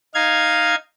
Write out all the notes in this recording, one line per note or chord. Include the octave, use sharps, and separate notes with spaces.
D#4 F5 G#6